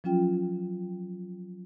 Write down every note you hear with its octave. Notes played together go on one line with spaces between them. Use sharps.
F3 F#3 C#4 F4 G5